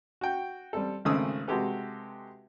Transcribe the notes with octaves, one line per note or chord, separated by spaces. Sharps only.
F#4 G5
G3 C4 A4
G#1 C#3 A3 C4 D#6 E6
C3 G#3 F#4 G4 A4 B4